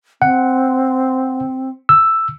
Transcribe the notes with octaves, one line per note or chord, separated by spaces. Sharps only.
C4 F#5
E6